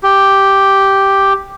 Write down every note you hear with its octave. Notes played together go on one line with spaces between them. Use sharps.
G4